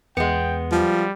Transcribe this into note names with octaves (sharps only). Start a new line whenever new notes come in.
E2 G#3 B3 G5 C#7
F3 G3